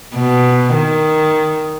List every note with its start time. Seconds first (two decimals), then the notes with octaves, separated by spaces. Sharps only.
0.15 B2
0.75 D#3